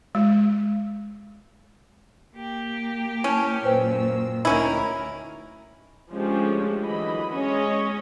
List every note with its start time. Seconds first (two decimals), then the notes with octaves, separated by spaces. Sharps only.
0.15 G#3
2.36 A#3 G4
3.24 C#4 E4 A5
3.65 F#2 A#2 B4 C5 G5 E6
4.45 D2 D#3 C#4 D#4 E4 A#4 C#5 A#5
6.12 F3 G#3 A3 C#4 D4 G4
6.81 D3 E3 F#3 D#5 B5
7.34 G#3 C#4 C#5 D#5